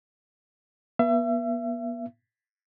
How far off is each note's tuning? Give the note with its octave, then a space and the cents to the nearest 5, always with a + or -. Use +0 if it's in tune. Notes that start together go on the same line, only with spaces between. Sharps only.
B3 -35 E5 +35